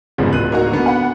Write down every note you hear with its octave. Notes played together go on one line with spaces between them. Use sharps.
G1 G#2 C#3 F3 B3 C4
D1 F#6 D#7
A#3 D#4 F#4
D3 B3
F#5 B5